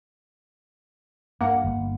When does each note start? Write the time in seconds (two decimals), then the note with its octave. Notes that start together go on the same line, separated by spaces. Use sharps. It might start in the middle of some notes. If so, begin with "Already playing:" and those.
1.41 G2 A#3 F#5
1.64 G1